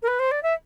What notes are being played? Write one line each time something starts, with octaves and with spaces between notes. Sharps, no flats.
A#4
B4
C5
D5
E5